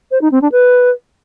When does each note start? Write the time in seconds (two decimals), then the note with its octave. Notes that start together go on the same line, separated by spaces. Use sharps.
0.11 C5
0.21 D#4
0.32 C4
0.42 D4
0.52 B4